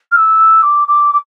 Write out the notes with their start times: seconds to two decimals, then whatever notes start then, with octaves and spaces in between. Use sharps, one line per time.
0.11 F6
0.16 E6
0.62 D6
0.87 D6
1.12 D6